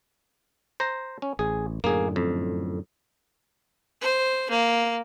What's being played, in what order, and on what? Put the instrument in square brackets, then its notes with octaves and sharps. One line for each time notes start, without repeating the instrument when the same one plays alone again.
[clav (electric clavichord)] C5 A#5
C#4
[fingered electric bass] A1 [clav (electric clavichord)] G#4
[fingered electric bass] F#2 A2 D3 [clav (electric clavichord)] A#3 G#4
[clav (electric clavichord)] F2
[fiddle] C5
A#3